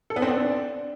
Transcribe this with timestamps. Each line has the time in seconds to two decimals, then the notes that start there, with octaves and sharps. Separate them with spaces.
0.10 A4
0.16 B3
0.22 C4
0.28 D4